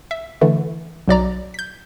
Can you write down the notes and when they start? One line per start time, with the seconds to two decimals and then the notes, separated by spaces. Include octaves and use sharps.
0.11 E5
0.41 D3 E3 A3
1.08 B1 F#3 D5 A#5
1.54 G6 B6